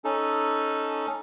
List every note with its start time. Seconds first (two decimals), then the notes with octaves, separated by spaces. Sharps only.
0.05 C#4 D#4 A4